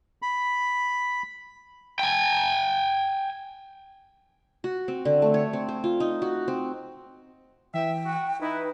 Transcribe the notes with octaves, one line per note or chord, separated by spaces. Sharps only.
B5
G5 G#5
F#4
C4
D3
A3
C#5
C4
C5
F4
D#4
F#4
C4
E3 E5 G5
F#4
D#4 E4 B4